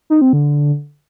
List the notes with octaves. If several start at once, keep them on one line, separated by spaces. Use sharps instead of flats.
D#4
C4
D3